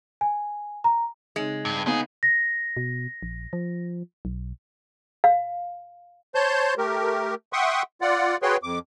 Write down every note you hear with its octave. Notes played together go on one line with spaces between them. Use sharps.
G#5
A#5
C#3 G#3 C4 D#4
G2
B3 C#4 D#4 G#4 F5
A#6
B2
A#1
F3
B1
F5
C5 C#5 A5 C6 G6
A3 G4 A#4
E5 F#5 G5 C6 C#6 D#6
F4 D5 F#5
F#4 G#4 B4 C#5 G5 C6
F2 D6